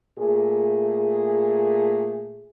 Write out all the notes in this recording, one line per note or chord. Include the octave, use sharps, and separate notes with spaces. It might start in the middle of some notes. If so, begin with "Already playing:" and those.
A#2 A3 G#4